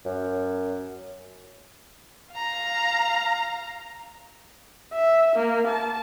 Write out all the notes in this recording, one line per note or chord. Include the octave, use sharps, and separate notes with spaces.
F#2
F5 A#5
E5
A#3
A5